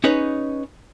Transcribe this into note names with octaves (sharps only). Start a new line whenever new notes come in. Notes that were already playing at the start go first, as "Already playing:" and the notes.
C#4 D#4 G#4 B4 C#5